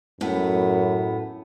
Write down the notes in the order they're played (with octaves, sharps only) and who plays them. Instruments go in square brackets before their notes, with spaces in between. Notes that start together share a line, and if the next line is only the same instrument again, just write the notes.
[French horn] F#2 [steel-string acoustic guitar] A2 B3